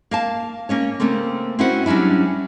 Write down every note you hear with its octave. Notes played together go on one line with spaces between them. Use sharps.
A#3 F5 A5
A#3 C#4 C#5
C#3 A3 A#3 C4
C4 C#4 E4 F#4 C5 F#5
F#3 G3 C#4 D4 E4